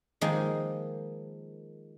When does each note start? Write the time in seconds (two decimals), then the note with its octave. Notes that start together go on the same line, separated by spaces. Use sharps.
0.21 D#3 F3 G#3 A#3 D#4